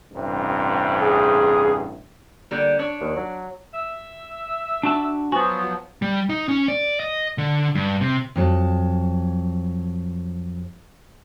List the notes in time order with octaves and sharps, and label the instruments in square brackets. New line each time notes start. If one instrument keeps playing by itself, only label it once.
[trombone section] A1 G2 C3
[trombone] G#4
[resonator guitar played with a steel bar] D3 G3 A#3
D4 C#5
[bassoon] D#2
F#3
[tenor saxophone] E5
[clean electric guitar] D4 F#4 A5
[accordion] F3 F#3 B3 [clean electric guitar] F#4 [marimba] G#5
[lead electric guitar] G3
D#4
C#4
D5
D#5
D3
G2
C3
[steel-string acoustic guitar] F2 F#3 A5